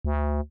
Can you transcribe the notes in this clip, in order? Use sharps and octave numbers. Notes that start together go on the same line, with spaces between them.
D2